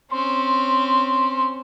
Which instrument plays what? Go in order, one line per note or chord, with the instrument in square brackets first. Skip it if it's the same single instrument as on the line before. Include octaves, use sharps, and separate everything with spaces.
[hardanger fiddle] C4 C#4 [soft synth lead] C6